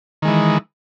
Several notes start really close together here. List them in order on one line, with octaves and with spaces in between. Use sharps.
D#3 G#3 E3